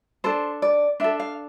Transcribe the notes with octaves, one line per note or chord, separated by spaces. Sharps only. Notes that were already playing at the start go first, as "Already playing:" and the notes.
D4 A4 C5
D5
D4 A4 E5
F5